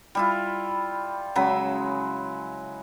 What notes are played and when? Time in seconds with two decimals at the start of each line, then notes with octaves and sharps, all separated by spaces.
0.15 G3 E4 F4
1.35 C#3 F#3 G#3 B5